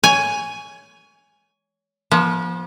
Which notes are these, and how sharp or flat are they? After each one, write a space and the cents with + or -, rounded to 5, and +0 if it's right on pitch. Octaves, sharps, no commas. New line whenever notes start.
C#5 +25 G#5 +0
F3 +0 B3 -40